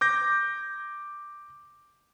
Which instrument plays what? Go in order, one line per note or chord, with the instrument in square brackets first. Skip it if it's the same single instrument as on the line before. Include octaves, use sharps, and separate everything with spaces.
[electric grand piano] D6 G6 A#6